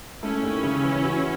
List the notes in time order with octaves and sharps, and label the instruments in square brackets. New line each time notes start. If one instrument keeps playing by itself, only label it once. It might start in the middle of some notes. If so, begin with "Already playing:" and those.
[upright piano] A3 [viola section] C#4 E4
[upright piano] D#2
C#3
E3
F#4